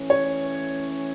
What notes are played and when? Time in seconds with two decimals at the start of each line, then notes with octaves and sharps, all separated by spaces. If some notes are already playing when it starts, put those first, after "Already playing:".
Already playing: E3 A3 C#4
0.10 C#5